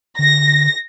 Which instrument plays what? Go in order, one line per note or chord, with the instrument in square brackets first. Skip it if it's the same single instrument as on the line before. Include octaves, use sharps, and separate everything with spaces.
[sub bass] D3 [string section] A#6